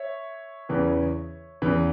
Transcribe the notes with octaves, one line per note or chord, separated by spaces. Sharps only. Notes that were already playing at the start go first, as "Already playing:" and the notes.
Already playing: C#5 E5
E2 C#3 E3 B3
E2 C#3 E3 B3